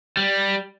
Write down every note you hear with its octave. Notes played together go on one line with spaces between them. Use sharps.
G3